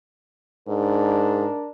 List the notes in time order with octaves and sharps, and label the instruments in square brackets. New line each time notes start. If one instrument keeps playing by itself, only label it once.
[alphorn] G#2 [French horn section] D4 A#4